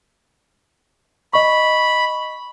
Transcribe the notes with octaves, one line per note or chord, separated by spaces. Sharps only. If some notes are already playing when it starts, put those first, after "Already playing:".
D#5 B5 C#6